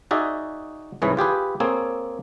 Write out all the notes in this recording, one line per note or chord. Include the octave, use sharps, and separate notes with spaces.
D#4 F#4 G#4 D5 E5
C2 G#2 E3 G#4 B4 C#5
F4 G4 G#4 B4
A#3 C4 G#4 A4 C#5